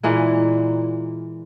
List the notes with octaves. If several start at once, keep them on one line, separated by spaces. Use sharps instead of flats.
A#2 E3 G#3 A#3